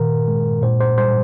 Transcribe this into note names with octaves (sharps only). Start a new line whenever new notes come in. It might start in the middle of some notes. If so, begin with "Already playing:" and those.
Already playing: A#2 D#3 A#4
G#3
A#2 C5
C5
G3 C5